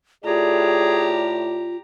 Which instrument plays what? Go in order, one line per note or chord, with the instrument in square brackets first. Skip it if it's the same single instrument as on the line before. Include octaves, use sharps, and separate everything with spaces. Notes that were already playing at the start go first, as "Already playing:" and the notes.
[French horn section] A2 D5 [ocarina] F4 [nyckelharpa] G4 A#5 [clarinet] G#4